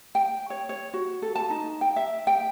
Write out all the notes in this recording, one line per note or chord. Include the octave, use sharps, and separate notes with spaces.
G5
C#5
C#5
F#4
A4
A5
D#4
G5
E5
G5